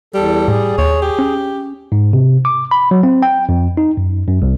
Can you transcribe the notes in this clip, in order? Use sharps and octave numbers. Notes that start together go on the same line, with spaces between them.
E2 G3 A4
A2 G#4
D#2 C#5
G4
C#4
G#2
C3
D6
B5
F#3
C4
G5
F2
D#4
F#2
F#2
C2